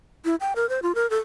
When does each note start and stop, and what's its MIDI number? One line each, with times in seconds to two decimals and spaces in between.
0.25 0.35 64
0.40 0.53 79
0.56 0.68 70
0.69 0.80 72
0.83 0.95 65
0.95 1.09 70
1.10 1.18 69